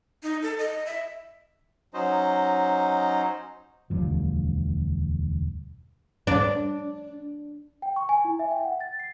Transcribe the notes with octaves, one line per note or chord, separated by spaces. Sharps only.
D#4
A4
D#5
E5
F#3 C#4 D#4 C5 D#5
E1 D2 G2 F3
D4
G5
C#6
G#5
E4
E5
G5
F#5
A6
C7